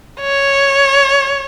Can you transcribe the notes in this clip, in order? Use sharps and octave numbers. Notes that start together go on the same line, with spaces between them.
C#5